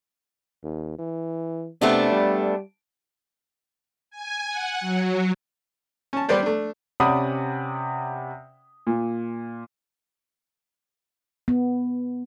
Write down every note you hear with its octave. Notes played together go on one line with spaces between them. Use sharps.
D#2
E3
C3 A3 B3 D4
G3
G#5
F#5
F#3
C#4 A5
G3 B3 B4 C5 D5
A3 D4
C3 C#4 D5 F#5 B5 D#6
A#2
B3